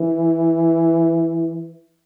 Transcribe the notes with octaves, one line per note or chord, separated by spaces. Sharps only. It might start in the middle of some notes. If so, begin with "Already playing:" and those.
Already playing: E3